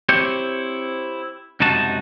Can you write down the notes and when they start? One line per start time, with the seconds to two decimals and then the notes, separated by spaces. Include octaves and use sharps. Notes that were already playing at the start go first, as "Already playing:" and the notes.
0.09 C4 E4 G4 C5 C#5
1.60 C#2 F#2 C3 D#4 F#4 A5